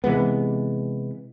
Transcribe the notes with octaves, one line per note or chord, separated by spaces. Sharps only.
C3 E3 G#3 B3